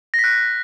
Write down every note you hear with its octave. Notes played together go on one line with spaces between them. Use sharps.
A#6
B6
F#6